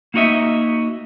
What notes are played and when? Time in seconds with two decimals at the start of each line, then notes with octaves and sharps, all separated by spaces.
0.14 A#3 D#4 F#4 D#5 E5